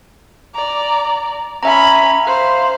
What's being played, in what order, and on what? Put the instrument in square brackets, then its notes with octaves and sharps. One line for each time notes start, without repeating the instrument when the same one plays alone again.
[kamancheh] D5 A#5
[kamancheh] C#4 B5 [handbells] E5 A#5
[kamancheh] C5 F5